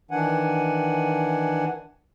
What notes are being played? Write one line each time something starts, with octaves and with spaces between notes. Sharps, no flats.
D#3 E3 D4 F#5 G#5